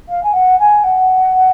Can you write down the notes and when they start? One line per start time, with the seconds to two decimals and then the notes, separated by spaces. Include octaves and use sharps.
0.08 F5
0.23 G#5
0.33 F#5
0.59 G#5
0.83 F#5